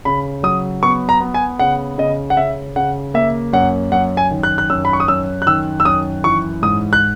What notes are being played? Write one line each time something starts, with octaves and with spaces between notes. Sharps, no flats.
C#3 B5
F#3 D#6
B3 C#6
A#5
B3
G#5
C#3 F#5
C#3 D#5
F#5
C#3 E5
C#3 F#5
A#3 E5
F#2 F#5
F#2 F#5
G#5
D#3
F#6
F#6
F#2 E6
B5
C#6
D#6
F#2 E6
F#6
D#3 E6
E6
F#2 D#6
E3 C#6
G#2 D#6
F#6